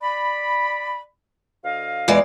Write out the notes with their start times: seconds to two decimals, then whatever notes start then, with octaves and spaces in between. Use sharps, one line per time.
0.01 D5 B5
1.64 D2 D#5 F5
2.08 E2 G#3 D5